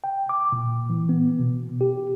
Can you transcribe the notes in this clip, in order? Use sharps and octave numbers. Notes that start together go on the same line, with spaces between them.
G5
D6
A#2
E3
B3
B2
G4